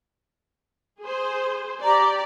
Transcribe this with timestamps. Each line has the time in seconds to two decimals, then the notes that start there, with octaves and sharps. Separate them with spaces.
1.00 G#4 C5
1.84 G4 D5 A#5